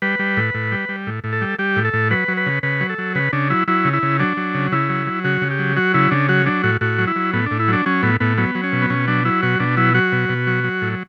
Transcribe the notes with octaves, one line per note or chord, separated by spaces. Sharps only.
G3 B4
G3
A2
A2
G3
G3
A2
A2
A4
G3
G3 G4
A2
A4
A2
F#3 B4
F#3
B4
C#3
C#3 B4
F#3
A4
F#3
C#3 B4
C#3 D4
F#3 E4
F#3 E4
C#3
E4
C#3
F#3 D4
F#3
C#3
C#3 E4
F#3
F#3
C#3 F#4
C#3
G4
F#3
F#3 F#4
C#3 E4
C#3 D4
F#3 F#4
F#3 D4
A2 F#4
A2 F#4
F#3
E4
F#3
A2 B3
A2 D4
E4
F#3 D4
F#3 C#4
A2 B3
A2 B3
F#3 B3
F#3
C#4
B2
B3
B2 C#4
F#3 D4
F#3 E4
B2 F#4
B2 D4
F#3 E4
F#3 F#4
B2
B2
F#3
F#3
A2